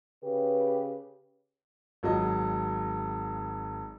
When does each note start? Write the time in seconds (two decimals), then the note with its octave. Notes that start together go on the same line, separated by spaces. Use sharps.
0.23 C#3 G4 B4
2.03 G#1 F#3 D#5